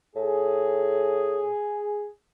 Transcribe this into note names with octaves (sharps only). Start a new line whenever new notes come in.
A2 G#4